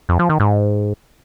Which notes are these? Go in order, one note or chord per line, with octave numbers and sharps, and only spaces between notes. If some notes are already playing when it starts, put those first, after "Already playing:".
F2
F3
D#3
G#2